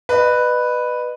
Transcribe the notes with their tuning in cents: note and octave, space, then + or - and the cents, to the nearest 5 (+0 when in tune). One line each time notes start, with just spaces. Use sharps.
B4 +0 D#5 -40